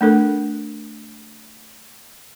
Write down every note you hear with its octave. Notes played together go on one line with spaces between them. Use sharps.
A3 D4 A4 A#4